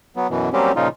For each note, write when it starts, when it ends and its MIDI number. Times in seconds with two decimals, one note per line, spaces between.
0.16 0.27 54
0.16 0.27 59
0.30 0.49 42
0.30 0.49 47
0.30 0.49 52
0.53 0.72 54
0.53 0.72 55
0.53 0.72 58
0.53 0.72 60
0.53 0.72 61
0.53 0.72 67
0.76 0.88 46
0.76 0.88 49
0.76 0.88 53
0.76 0.88 63
0.76 0.88 65